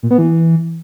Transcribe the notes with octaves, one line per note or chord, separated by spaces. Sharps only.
A#2
B3
E3